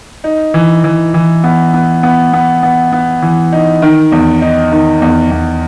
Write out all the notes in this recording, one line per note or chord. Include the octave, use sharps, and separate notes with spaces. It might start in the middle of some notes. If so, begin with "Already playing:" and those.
D#4
E3
E3
E3
B3
B3
B3
B3
B3
B3
E3
D#4
D#3
E2
D#4
D#3
E2
E2